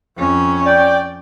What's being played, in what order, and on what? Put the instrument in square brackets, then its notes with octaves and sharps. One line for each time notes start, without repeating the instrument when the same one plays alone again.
[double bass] F2 C#4
[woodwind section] D5 G5